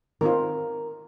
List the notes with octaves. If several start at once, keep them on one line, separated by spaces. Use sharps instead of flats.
D#3 C4 F4 A#4